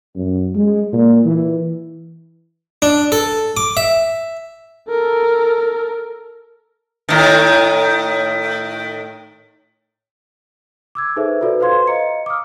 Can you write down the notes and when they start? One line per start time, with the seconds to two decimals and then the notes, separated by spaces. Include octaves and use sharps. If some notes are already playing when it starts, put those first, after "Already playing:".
0.16 F#2
0.55 G#3
0.93 A#2
1.25 E3
2.82 D4
3.12 A4
3.57 D6
3.77 E5
4.90 A4 A#4
7.09 A2 D#3
10.95 D6 E6 G#6
11.16 D#4 G#4 A4 B4 C5 E5
11.41 F4 F#4 A4 B4 D5
11.60 B4 C5 F5 C6 G#6
11.87 D#5 F5 A#5 C#7
12.26 D6 D#6 F6